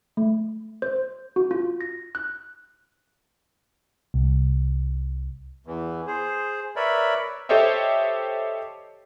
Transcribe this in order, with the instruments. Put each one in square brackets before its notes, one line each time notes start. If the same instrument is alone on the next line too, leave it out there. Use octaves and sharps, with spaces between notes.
[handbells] A3
C5
F#4
F4
A#6
F#6
[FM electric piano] C2
[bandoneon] E2 E3
G#4 C5
A#4 B4 C#5 D5 E5 B5
[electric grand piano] G4 A4 C5 C#5 D#5 E5